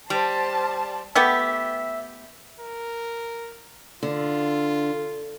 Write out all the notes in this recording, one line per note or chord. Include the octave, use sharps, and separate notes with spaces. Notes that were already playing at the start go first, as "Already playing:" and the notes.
G3 C5 A5
A3 B3 G4 E5
A#4
D3 F4